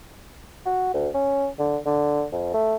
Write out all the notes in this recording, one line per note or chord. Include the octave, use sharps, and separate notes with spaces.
F#4
D2
C#4
D3
D3
F2
A3